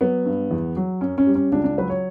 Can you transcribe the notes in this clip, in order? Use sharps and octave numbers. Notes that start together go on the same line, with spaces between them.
F#3 B3
G2
E2
F#3
F#2 C#4
C#4
G3
C#4
C#2 D4
D4
F#3 B4
C#5